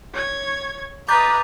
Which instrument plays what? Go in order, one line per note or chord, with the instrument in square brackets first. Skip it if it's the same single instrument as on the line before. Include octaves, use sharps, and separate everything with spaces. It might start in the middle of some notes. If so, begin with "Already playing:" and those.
[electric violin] C#5 G#6
[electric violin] B4 D#5 [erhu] A#5 [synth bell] D6 G6 A6